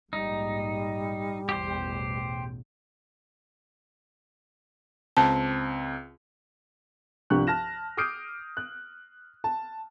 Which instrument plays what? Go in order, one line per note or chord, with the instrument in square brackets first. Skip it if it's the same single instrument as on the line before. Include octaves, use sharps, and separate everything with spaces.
[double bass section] A#1 G#2 [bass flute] G3 [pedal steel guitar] D#4
[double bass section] A1 E2 B2 [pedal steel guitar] G4 C5
[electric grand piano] C#2 C4 [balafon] A5
[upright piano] C2 G2 F3 G4 C#6 F#6
A5 F6 A#6 E7
D6 D#6 F6 G6 C7 D7
F#6
A5